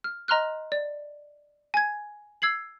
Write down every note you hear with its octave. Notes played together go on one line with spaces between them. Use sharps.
F6
D#5 A#5 C6 F6 F#6
D5
G#5 G#6
E6 G#6 C7 F#7